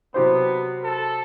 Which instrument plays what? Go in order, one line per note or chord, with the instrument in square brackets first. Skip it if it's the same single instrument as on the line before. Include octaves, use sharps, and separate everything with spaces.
[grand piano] C3 F#3 C4 G4 C5 [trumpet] B3
[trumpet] A4